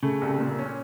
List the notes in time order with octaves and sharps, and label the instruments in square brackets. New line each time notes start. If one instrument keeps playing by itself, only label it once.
[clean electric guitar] C#3 [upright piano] A3
[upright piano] C2
A#2
C#4